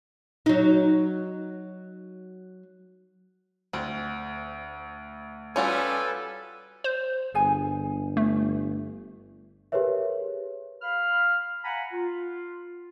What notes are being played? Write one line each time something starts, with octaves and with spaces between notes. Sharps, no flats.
F#3 D#4
D2 C4
G3 C#4 F4 F#4 A4 B4 G#5
C5
G1 G#4 G#5
A3
G4 G#4 A#4 B4 C#5 E5
F5 B5 F6
F5 F#5 G#5 A#5 B5
F4